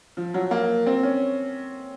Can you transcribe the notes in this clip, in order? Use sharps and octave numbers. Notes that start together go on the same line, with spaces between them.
F3
F#3
A#3
C4
C#4